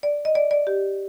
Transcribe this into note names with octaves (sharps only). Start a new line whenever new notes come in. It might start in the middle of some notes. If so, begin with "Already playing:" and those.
D5
D#5
D5
D5
G4